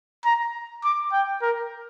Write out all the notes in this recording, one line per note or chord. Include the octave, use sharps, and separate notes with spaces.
A#5
D6
G5
A#4